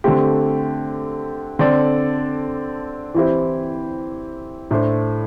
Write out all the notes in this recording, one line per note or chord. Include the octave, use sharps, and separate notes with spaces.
D3 A3 C4 G4
D3 C4 A4 D5
E3 C4 E4 G4 C5
A2 A3 D4 C5